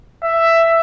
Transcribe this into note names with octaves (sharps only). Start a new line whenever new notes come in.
E5